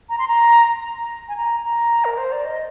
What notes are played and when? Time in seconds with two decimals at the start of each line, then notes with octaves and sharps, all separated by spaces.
0.10 A#5
0.19 C6
0.28 A#5
1.28 G#5
1.37 A#5
1.64 A#5
2.05 A#4
2.18 C5
2.32 D5
2.45 D#5